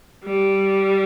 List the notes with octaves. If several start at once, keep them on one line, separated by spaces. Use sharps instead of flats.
G3